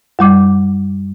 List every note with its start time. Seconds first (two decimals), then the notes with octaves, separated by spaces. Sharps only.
0.19 F#2 G3 D6